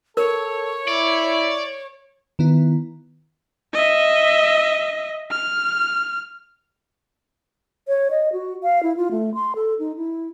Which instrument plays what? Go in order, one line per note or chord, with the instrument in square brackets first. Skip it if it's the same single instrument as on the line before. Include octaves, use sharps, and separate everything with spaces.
[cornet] A4 [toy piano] A#4 [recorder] C#5
[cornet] E4 [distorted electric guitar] D5
[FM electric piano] D#3 B3 E4
[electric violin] D#5 E5
F6
[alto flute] C#5
D#5
F#4
F5
E4
F4
A3
C6
A4
D#4
E4